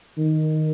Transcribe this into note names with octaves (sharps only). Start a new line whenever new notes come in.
D#3